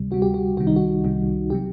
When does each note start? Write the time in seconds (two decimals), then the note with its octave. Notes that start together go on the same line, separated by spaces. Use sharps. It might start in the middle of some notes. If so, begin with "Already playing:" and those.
Already playing: D2 C3 G3
0.11 D2 C3 G3 F#4
0.22 G4
0.34 F#4
0.57 C2 C3 D#3 G3 F#4
0.67 D#4
0.76 F#4
1.04 C2 C3 D#3 G3
1.50 C3 F#3 G4